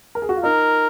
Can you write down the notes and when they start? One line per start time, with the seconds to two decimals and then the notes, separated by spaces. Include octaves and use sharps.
0.15 A#4
0.22 G#4
0.29 F#4
0.36 F4
0.43 D#4 A#4